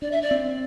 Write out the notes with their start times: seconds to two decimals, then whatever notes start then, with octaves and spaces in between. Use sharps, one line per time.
0.02 D4 D5
0.11 E5
0.22 D5
0.31 C4